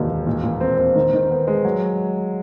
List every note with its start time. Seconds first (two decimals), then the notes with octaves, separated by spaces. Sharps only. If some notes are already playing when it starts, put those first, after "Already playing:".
Already playing: E1 D#2 D#3
0.10 E1
0.27 A#2
0.44 A#2
0.61 C4
0.78 C4
0.96 D#3
1.13 D#3
1.31 B3
1.47 G#3
1.65 F#3